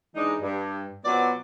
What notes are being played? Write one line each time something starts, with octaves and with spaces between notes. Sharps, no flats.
E3 G#3 D4 D#4
G2
B2 F#3 B3 C4 F4 D5